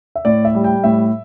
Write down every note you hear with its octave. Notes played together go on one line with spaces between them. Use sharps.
E5
A2 D5
E5
G3
G5
A2 E5